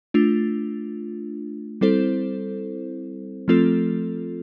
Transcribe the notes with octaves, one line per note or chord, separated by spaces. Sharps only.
A3 D4 F4
G3 C4 E4 A4 C5
F3 A3 C4 F4 A4